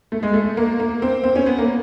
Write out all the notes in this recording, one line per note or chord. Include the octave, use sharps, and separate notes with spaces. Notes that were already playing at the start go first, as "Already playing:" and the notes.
A3
G#3
A3
A#3
A#3
C4
C4
C#4
B3
A#3